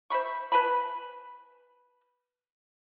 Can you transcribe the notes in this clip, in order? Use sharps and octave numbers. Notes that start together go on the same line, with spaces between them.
C5 E5 B5 C#6
B4 G#5 A5 B5